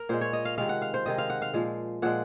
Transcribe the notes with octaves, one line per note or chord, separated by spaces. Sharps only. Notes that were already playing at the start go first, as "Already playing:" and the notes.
Already playing: A#4
A#2 G#3 C5
C#5
D#5
F5
C3 D#3 G#3 F5
F#5
F5
C5
C3 D#3 G#3 D#5
F5
F#5
F5
A#2 F3 G#3
A#2 F3 G#3 F#5